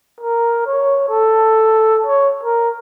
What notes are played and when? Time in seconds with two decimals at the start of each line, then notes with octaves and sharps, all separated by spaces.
0.20 A#4
0.66 C#5
1.09 A4
2.06 C#5
2.43 A#4